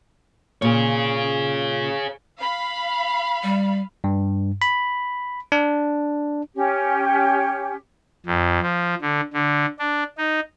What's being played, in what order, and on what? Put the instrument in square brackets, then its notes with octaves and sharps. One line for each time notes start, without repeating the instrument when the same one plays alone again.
[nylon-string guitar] A#2 [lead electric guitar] G#4 C#5
[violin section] F5 B5
[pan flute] G3
[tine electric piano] G2
B5
D4
[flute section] C#4 G4
[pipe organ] F2
F3
D3
D3
D4
D#4